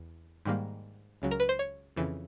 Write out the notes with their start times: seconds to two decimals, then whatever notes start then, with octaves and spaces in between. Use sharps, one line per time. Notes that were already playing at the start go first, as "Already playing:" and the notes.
Already playing: E2
0.45 G#2 D#3 G3 A#3
1.22 C#2 C#3 F#3
1.31 A#4
1.40 B4
1.49 C5
1.59 C#5
1.96 F2 C#3 E3